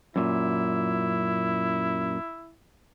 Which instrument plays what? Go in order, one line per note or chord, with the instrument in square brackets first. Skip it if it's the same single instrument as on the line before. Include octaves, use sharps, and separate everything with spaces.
[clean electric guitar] F#2 A#2 [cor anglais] E4